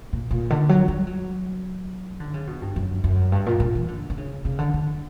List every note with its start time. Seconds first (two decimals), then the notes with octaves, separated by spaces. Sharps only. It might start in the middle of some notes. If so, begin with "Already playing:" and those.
0.13 A#2
0.31 A#2
0.50 D3
0.69 F#3
0.88 G3
1.07 F#3
2.20 D3
2.34 C#3
2.47 B2
2.62 G2
2.76 F#2
3.04 F#2
3.32 G2
3.46 A#2
3.60 A#2
3.75 E3
3.88 D3
4.10 D3
4.17 C#3
4.45 C#3
4.59 D3
4.74 D3